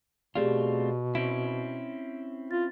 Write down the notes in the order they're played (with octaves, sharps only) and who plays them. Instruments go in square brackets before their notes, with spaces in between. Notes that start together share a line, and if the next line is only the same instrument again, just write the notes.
[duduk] B2 [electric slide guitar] A3 C4 F4 [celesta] G4 G#4 D5
[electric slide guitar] C4 C#4 E4 [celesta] D7
[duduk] F4 [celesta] A6